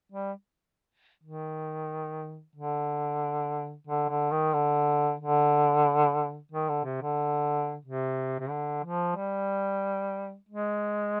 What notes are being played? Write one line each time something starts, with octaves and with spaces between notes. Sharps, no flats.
G3
D#3
D3
D3
D3
D#3
D3
D3
D#3
D3
C3
D3
C3
C3
D3
F3
G3
G#3